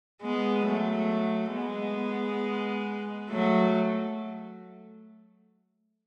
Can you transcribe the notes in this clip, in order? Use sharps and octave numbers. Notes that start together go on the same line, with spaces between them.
G#3 B3
F#3 A3
G#3 B3
F#3 A3